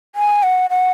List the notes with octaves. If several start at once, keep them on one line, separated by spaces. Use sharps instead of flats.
G#5
F#5
F#5